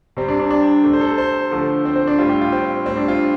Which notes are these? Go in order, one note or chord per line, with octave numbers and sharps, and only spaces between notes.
C3 G3 C4
D4
D4
D4
C3 A3
C5
A4
C5
D3 F3 A3
C4
C4
D4
A2 G3 F4
G4
F4
C4
A2 G3 C4
D4
F4